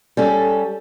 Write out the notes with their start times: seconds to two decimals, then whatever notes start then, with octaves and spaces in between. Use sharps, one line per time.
0.17 G3 C#4 A4